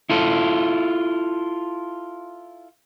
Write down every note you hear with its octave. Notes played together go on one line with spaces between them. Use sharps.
E4 F4 A4